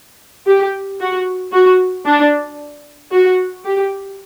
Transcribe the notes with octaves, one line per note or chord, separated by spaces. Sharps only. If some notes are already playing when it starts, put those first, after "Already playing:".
G4
F#4
F#4
D4
F#4
G4